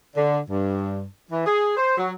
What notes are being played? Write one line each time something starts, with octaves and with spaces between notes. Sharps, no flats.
D3
G2
E3
G#4
C5
F#3